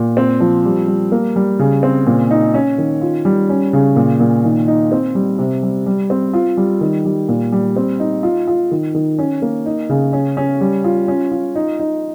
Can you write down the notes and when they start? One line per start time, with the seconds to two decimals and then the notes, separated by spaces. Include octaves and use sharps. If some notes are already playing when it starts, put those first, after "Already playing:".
Already playing: A#2
0.17 C4
0.40 F3
0.65 G3
0.88 G3
1.12 A#3
1.36 G3
1.59 C#3
1.83 C4
2.07 A#2
2.31 D#4
2.54 C#4
2.78 D#3
3.01 F4
3.25 G3
3.49 C#4
3.73 C#3
3.96 A#2
4.20 A#2
4.44 D#3
4.68 D#4
4.92 C4
5.15 G3
5.39 C3
5.63 G3
5.86 G3
6.10 C4
6.34 F4
6.57 G3
6.81 D#3
7.05 G3
7.29 A#2
7.52 G3
7.76 C4
8.00 D#4
8.23 F4
8.47 F4
8.71 D#3
8.95 D#3
9.19 C#4
9.42 A#3
9.66 D#4
9.89 C#3
10.13 C#4
10.37 C#4
10.61 G3
10.84 F4
11.08 C#4
11.31 F4
11.55 D#4
11.79 D#4